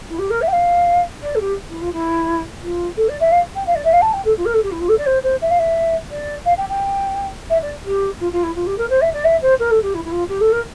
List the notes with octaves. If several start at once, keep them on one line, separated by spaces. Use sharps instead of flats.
E4
G4
A#4
E5
G5
F5
D5
A4
G4
E4
F4
E4
F4
A4
D5
E5
F5
G5
F5
D5
E5
F5
A5
G5
A4
F4
A#4
A4
G4
E4
F4
A4
D5
C5
C5
E5
F5
E5
D5
F5
G5
G5
E5
D5
G4
F4
F4
E4
F4
G4
A#4
C5
E5
D5
E5
C5
A#4
A4
G4
E4
E4
F4
G4
A4
A#4